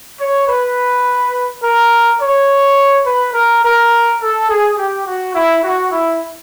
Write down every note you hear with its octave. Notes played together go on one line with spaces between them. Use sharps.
C#5
B4
A#4
C#5
B4
A#4
A#4
A4
G#4
G4
F#4
E4
F#4
E4